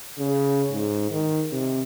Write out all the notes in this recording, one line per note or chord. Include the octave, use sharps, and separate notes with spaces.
C#3
G#2
D#3
C3